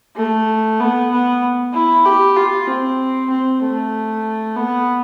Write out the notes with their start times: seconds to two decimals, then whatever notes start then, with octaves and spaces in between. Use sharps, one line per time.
0.16 A3
0.80 B3
1.11 B3
1.74 E4
2.05 G4
2.37 F4
2.67 C4
3.30 C4
3.61 A3
4.56 B3